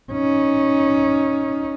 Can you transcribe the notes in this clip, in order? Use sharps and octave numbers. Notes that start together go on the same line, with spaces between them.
C#4 D#4